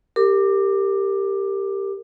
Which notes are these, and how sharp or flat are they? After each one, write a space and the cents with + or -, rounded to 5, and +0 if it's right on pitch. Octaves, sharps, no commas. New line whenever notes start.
G4 +5 A#4 -30 D6 +15